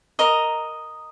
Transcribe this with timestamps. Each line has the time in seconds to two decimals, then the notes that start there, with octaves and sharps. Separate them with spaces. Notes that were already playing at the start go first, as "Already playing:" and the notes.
0.19 A#4 D#5 A#5 D#6